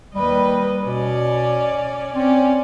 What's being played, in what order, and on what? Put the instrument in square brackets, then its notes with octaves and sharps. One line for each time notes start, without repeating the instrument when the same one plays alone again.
[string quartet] D#2 B4 D#5 [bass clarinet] G3
[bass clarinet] B2 [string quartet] C#4 D5
[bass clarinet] C4 [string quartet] C#4 D5